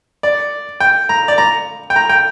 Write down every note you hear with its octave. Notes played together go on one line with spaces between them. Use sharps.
D5
G5
A#5
D5
A#5
G5
A#5
G5